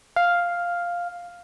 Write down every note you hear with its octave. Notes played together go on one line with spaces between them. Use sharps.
F5